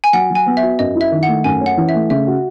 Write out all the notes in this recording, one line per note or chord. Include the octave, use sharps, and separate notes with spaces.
G#5
F#3 F#5
F#3
G#5
B3
E5
F#4
F#2 D#5
E4
E5
D#3
F#5
A3
F#2 G#5
C#4
F#5
E3
E5
A3
C#3 E5
F#4